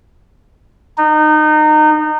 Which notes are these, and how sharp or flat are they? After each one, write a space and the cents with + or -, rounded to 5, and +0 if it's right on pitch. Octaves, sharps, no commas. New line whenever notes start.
D#4 -25